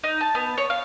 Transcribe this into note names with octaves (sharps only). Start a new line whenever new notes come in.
D#4
A5
B3
C#5
F5